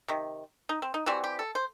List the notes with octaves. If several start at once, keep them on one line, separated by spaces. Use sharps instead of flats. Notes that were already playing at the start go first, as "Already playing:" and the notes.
C3 D#3
D#4
C4
D#4
E3 G3 C4 F#4
G4
A4
C5